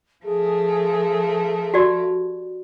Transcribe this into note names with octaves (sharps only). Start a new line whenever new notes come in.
F3 A3 G#4 A#4
F#4 G4 D5